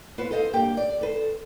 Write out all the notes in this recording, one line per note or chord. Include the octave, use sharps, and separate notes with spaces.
B3 F4 B4 C5
A4 C5 D#5 F5
G2 A#3 G4 G5
D5
A4 B4 C5